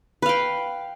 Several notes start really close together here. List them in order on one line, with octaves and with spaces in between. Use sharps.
B4 F5 G5